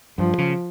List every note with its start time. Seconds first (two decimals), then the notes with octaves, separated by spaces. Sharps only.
0.18 G2 F3
0.38 C#3